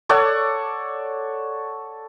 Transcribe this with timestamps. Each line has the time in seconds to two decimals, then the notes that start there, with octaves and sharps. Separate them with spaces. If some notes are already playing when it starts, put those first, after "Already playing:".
0.09 A4 C#5 D5 F#5